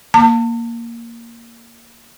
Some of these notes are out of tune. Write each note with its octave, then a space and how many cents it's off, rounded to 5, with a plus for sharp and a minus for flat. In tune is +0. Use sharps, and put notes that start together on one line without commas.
A#3 +0 A5 +35